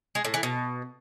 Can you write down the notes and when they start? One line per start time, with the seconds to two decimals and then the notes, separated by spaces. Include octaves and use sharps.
0.15 G#3
0.25 A2
0.34 E3
0.43 B2